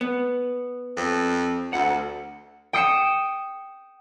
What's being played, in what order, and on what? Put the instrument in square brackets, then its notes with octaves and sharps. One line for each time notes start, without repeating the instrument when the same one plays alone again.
[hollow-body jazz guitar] B3
[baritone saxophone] F2
[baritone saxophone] D2 [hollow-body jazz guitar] F#5
[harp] G5 D#6 C#7 E7